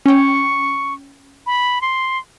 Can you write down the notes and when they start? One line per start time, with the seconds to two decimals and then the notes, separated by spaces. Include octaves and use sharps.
0.06 C#4 G5 C#6
1.46 B5
1.82 C6